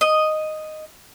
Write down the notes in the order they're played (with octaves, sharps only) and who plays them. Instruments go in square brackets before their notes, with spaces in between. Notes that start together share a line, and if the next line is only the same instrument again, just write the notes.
[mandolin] D#5